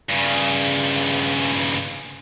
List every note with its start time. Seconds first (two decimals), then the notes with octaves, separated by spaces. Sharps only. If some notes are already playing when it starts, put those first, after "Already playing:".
0.09 G2 C#3